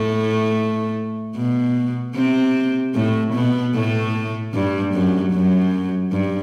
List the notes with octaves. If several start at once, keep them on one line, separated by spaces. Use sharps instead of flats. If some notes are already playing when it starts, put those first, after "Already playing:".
Already playing: A2 A3
B2 B3
C3 C4
A2 A3
B2 B3
A2 A3
G2 G3
F#2 F#3
F#2 F#3
G2